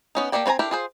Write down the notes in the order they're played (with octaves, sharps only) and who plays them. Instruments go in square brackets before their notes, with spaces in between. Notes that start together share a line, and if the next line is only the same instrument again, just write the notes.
[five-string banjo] B3 C#4 D#4
A#3 G4 A4 D5 G5
C4 B4 C#5 G#5 A#5
D4 E4 G4 A4 A#4
F4 G#4 C5